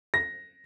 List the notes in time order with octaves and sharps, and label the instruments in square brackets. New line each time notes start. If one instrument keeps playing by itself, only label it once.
[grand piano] A#6